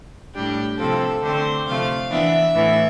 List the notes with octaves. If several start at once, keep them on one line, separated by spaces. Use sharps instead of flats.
A2 G3 D4 G4
C3 F3 C4 A4
D3 A3 C4 C5
C3 F3 A3 F5
E3 B3 D4 E5
A2 E3 B3